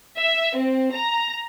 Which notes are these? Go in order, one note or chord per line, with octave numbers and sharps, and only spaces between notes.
E5
C4
A#5